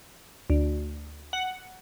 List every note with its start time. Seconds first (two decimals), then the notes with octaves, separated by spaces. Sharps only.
0.50 D2
1.33 F#5